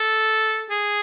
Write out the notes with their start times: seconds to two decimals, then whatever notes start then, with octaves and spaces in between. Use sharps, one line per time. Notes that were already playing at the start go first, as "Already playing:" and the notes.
Already playing: A4
0.70 G#4